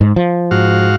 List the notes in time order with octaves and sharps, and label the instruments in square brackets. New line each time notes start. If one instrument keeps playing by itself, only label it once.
[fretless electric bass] G#2
F3
[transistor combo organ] G#2 F#4 F5